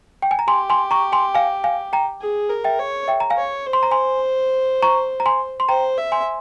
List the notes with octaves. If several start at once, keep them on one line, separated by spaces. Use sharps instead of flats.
G5
G#5
A#5
G4 G#5 C6
G#5 C6
A#5 C#6
G#5 C6
F5 G#5
F5 G#5
G5 A#5
G#4
A#4
E5 G5
C#5
E5 G5
A#5
F5 G#5
C#5
C5
C6
A#5
G#5 C6
A#5 C#6
A#5
G#5 C6
C6
C5 G5 A#5
E5
G#5 C6